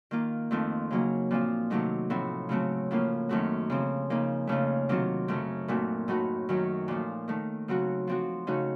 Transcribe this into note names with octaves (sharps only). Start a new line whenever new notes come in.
D#3 A#3 F4
F2 D#3 A3 C4 F4
C#3 F#3 A#3 D#4
A#2 F3 C4 F4
C3 D#3 F#3 A3 D#4
A2 F3 C4 F#4
C#3 F#3 A3 C4 F#4
A2 F3 A#3 C#4 F4
F#2 D#3 A3 C4 F#4
C#3 F3 C4
C#3 F3 A#3 D#4
F2 C#3 A3 C#4 F4
C3 D#3 F#3 C4 F4
F#2 C#3 A3 C4
A#2 A3 C4 D#4 F#4
A2 A3 D#4 F#4
F#2 D#3 F#3
A#2 F3 A3
D#3 A3 D#4
C#3 F#3 C4 F#4
F3 C4 F#4
C#3 A3 D#4 F#4